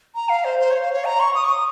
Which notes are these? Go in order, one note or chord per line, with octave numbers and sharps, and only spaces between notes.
A#5
F5
C5
C5
C#5
F5
C#5
A#5
C#6
D#6
C#6
D#6